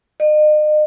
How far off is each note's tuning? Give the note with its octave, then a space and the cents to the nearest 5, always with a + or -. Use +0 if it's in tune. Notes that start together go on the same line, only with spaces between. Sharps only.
D#5 -40